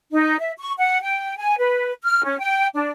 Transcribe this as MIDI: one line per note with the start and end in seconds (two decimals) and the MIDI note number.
0.12 0.38 63
0.40 0.52 76
0.58 0.72 85
0.78 1.02 78
1.02 1.37 79
1.37 1.55 80
1.59 1.92 71
2.03 2.24 89
2.24 2.37 61
2.40 2.66 79
2.75 2.90 62